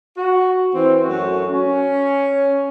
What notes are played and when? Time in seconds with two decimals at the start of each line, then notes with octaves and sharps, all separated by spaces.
0.16 F#4
0.73 E3 C4
1.04 F#2 A3 F#4
1.50 C#4